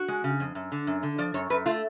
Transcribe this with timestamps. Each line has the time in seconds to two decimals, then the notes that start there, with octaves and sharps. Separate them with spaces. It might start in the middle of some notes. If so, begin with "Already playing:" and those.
Already playing: F#4
0.08 G#3
0.24 C#3
0.40 F2
0.55 F#2
0.72 D3
0.87 F#2
1.03 D3
1.18 F3 D5
1.34 F#2 C#5
1.50 F#2 B4
1.66 A3 F4